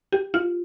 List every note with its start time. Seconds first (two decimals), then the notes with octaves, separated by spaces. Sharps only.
0.12 G4
0.34 F4